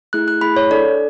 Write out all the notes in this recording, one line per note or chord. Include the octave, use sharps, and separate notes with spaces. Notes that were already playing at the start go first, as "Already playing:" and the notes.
A3 E4 G#4 F#6
F#6
A3 E4 G#4 B5
C#5
D4 A4 D5